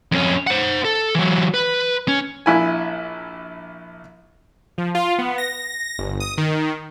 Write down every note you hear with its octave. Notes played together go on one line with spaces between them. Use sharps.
F2 C#4
C5 F#5
A4
E3 F#3
B4
C#4
A#1 E4 G#5
F3
F4
B3
A#6
G1
D#6
D#3